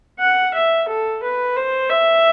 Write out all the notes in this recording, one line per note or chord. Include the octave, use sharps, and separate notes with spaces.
F#5
E5
A4
B4
C5
E5